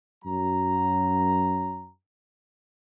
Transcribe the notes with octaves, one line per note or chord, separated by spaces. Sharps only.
F#2 F#3 A#5